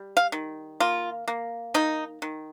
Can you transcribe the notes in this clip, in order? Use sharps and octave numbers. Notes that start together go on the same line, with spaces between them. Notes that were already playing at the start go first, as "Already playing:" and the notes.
Already playing: G3
F5
D#3
A#3 F4
A#3
D#3 D#4
D#3